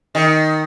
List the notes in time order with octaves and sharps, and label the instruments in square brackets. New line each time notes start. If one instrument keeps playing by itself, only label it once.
[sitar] D#3